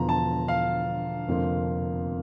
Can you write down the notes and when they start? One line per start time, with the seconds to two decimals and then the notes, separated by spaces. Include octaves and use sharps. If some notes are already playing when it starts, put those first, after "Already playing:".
Already playing: E1 E2 D3 F3 A#5
0.09 A5
0.48 F5
1.27 F1 F2 D3 F3 A#3